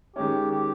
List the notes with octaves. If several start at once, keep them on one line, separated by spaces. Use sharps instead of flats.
D#3 G#3 C#4 G4
G4